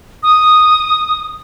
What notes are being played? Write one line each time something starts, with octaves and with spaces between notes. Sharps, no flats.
D#6